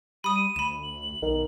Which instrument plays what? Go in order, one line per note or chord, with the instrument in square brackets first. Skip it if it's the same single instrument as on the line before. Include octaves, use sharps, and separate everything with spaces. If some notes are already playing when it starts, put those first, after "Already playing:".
[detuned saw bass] G3 [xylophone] B5 D#6 [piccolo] D#7
[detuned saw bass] D2 [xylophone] B5 E7
[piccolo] F#7
[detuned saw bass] B1 [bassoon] D#3